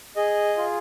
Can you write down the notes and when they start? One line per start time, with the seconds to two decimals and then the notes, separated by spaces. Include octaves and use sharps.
0.16 G#4 D#5
0.57 F4